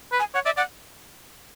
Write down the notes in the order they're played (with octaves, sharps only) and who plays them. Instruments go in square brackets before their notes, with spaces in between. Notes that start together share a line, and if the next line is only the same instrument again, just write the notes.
[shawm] B4
[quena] G#5
[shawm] C#5 [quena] F#5
[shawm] D5 [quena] E5
[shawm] D5 [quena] F#5